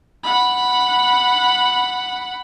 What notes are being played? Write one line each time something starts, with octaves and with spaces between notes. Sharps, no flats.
F#5 B5